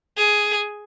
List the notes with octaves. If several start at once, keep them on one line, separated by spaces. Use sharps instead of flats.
G#4